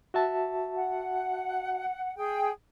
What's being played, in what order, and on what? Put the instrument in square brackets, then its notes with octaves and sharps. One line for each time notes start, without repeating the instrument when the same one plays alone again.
[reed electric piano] F#4 E5 A5
[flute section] F#5
G#4 G5